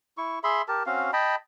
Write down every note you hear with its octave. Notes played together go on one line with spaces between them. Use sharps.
E4 C#6
G#4 E5 B5 C6
G4 A#4 A5
C4 C#4 F#4 F5
D#5 G5 A5 B5